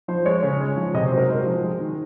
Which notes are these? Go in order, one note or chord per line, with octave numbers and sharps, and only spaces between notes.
F3 C5
G#3 C#5
C#3
G#3
F3
C3 D#5
C5
F#3
A#4
G#3 C5
F3
G#3
D#3